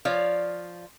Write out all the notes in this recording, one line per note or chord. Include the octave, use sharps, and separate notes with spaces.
F3 C#5 D5 F5